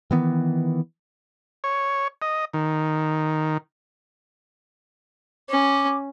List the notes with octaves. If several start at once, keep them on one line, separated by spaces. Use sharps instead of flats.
D#3 E3 B3
C#5
D#5
D#3
C#4 D6